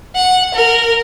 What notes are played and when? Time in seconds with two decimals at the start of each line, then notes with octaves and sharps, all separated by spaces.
0.16 F#5
0.54 A#4